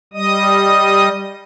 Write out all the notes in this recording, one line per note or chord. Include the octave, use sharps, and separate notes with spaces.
G3 D#5 D#6